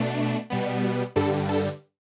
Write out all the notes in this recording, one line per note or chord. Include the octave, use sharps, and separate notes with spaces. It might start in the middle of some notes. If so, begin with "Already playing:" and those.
Already playing: B2 A3 D4
B2 G3 B3
G2 D3 G3 A4
A4